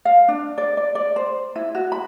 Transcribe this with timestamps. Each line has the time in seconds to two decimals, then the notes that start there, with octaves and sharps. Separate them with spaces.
0.05 F5
0.28 D4
0.58 D5
0.77 D5
0.95 D5
1.16 C5
1.56 E4
1.75 F#4
1.92 B5